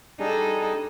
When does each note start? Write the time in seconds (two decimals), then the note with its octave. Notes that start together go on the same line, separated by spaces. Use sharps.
0.20 G3 D4 D#4 G#4 A4